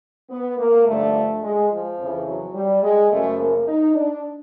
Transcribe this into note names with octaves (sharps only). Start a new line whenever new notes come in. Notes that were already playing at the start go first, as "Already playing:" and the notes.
B3
A#3
G2 D3 F3 A3
G#3
F3
F2 C#3 E3
F#3
G3
G#3
F#2 C#3 F3 A3
A#3
D#4
D4